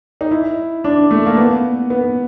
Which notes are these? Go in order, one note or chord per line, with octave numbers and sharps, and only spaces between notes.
D#4
E4
D4
A3
A#3
B3
B3